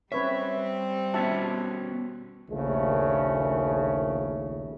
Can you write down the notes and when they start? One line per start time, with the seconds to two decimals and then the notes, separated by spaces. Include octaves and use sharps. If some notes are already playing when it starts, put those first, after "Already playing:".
0.12 G3 C4 C#4 B4 C#5 E5
1.14 B3 C#4 F#4 E5 A5
2.49 A#1 D#2 C#3 A3